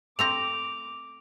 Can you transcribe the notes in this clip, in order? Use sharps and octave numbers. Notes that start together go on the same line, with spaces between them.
A3 C4 A#5 D6 F7